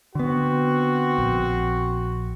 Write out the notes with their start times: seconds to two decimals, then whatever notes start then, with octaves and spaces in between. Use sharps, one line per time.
0.15 D3 B3 C4 F#4
1.18 A#1